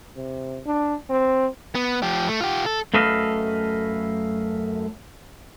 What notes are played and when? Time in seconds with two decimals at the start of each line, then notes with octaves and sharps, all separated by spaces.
0.16 C3
0.66 D4
1.10 C4
1.75 B3
2.02 F3 G4
2.28 A3
2.41 F4 G4
2.66 A4
2.94 F#2 A3 A4 B4 D#5 F5